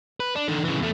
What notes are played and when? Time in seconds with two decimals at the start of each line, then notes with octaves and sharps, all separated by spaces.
0.20 B4
0.36 D4
0.48 D3 D#3
0.65 C#3 E3
0.79 E2 A3